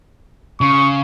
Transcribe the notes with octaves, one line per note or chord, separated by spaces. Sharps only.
C#3 C#6